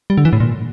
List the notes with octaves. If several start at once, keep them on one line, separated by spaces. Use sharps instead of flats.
G3
D3
E3
A2
A#2